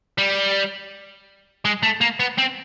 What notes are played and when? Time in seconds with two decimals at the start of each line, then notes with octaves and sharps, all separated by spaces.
0.18 G3
1.65 G#3
1.83 A3
2.01 A#3
2.20 B3
2.38 C4